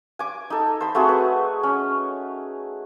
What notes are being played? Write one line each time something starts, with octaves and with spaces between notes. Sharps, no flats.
G#5 D6
D#4 A4
C5 B5
A3 C4 F#4 G#4
B4
C#4